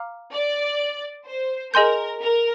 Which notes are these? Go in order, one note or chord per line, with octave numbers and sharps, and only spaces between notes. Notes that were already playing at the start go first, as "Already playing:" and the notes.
Already playing: F5 A#5 D6 F6
D5
C5
G#4 A#4 D#5 G#5 C6 G6
A#4